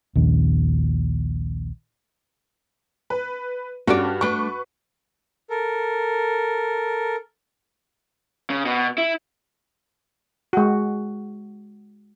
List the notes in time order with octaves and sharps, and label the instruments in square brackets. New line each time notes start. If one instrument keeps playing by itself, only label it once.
[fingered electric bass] A#1 D#2
[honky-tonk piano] B4
[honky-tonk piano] G2 [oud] C#4 A4 D5 [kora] F#4
[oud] A3 D4 [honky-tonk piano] B4 C#6
[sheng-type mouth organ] A4 A#4
[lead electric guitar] C#3
B2
E4
[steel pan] G#3 F#4